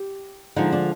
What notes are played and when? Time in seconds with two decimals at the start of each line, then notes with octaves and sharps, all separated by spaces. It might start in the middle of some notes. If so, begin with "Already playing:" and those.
Already playing: G4
0.56 D3 F3 G#3 D#4
0.72 D4